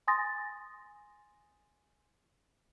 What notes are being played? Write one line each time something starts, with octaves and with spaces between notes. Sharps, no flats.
G#5 C6 D#6 A6 A#6